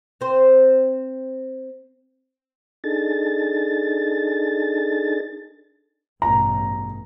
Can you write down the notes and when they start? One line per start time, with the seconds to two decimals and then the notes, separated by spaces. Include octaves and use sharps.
0.21 C4 C5
2.84 D4 D#4 G#4 A4 A6
6.22 A1 G2 B2 A#5